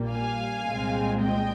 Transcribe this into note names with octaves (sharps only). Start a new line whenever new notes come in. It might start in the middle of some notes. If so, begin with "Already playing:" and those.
Already playing: A#1 A#2 G3 A#3
F5 G#5
C2 A#2 G#3 C4
D#5 G5